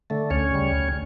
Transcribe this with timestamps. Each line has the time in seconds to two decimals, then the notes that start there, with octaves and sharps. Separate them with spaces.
0.10 D3 A3
0.30 D2 C#4 C#5
0.51 C#3 G3
0.72 D2